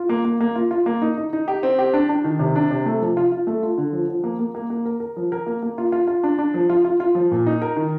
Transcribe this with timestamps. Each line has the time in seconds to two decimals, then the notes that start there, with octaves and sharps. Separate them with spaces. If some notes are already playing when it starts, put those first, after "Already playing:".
Already playing: F4
0.09 A#3
0.25 A#3
0.40 A#3
0.56 F4
0.71 F4
0.86 A#3
1.02 D#4
1.17 D#4
1.33 D#4
1.48 G4
1.63 C4
1.79 G4
1.94 D4
2.09 D4
2.24 D#3
2.39 C3
2.56 D4
2.71 C3
2.86 A3
3.02 F3
3.17 F4
3.32 F4
3.47 A3
3.63 F4
3.78 D3
3.93 F3
4.08 F3
4.24 A#3
4.39 A#3
4.55 A#3
4.70 A#3
4.85 A#4
5.00 A#4
5.16 F3
5.32 A#4
5.46 A#3
5.63 A#3
5.78 F4
5.92 F4
6.07 F4
6.23 D4
6.39 D4
6.54 F3
6.69 F4
6.85 F4
7.00 F4
7.15 F3
7.31 A#2
7.46 D#4
7.62 A#4
7.76 D#3